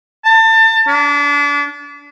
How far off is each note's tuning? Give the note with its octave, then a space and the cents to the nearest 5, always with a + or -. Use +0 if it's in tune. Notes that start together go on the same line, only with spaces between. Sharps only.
A5 +30
D4 -30